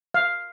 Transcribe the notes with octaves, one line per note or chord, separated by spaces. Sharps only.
F5